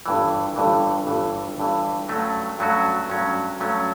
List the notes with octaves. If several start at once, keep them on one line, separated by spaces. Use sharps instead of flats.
G1 G2 E3
G1 G2 E3
G1 G2 E3
G1 G2 E3
G2 F#3 A3 C#4 F#4
G2 F#3 A3 C#4 F#4
G2 F#3 A3 C#4 F#4
G2 F#3 A3 C#4 F#4